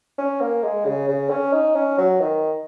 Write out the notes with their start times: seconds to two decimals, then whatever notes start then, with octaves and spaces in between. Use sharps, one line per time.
0.18 C#4
0.41 A#3
0.63 G#3
0.86 C#3
1.08 C#3
1.31 C#4
1.53 D#4
1.75 C#4
1.98 F#3
2.21 D#3